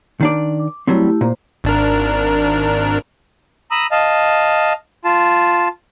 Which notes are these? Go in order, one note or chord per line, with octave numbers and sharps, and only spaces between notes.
D#3 D4 D5
D6
F#3 G3 A3 C4 E4 G4
A#2 C5 A#5
G#1 D4 A#4
A#5 B5 D#6 E6
D#5 F5 A5
F4 A5